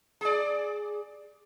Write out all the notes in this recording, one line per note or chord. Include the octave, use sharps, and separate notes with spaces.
G#4 D5